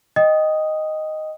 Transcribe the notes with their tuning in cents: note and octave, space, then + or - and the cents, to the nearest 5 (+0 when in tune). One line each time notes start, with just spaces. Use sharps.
D#5 +0 G5 +0 D#6 +0